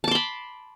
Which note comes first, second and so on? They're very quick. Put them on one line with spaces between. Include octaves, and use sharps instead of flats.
A5 D6 C6 B5